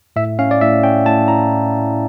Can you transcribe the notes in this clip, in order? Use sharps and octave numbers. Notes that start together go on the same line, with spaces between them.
A2 E5
C#4 F5
D5
A2 E5
C#4 G5
A2 A5
E4 A#5